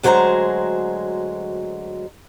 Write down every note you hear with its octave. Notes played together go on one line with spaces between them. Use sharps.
D2 F#3 G#3 C5 F#5 A#5